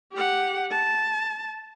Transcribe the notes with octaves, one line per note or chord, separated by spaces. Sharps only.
G4 F#5
A5